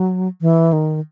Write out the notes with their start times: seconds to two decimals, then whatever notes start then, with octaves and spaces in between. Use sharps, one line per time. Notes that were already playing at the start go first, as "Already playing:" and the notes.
Already playing: F#3
0.41 E3
0.73 D#3